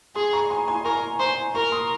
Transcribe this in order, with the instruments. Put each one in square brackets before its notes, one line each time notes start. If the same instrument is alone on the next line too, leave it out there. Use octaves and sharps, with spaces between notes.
[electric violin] G#4 [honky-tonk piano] C6 D#6
[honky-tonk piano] A#5 C#6
G#5 C6
G#5 C6
[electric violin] A#4 [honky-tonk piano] A#5 C#6
[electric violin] C5 [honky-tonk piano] G#5 C6
[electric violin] A#4 [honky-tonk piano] A#5 C#6
[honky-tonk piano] C6 D#6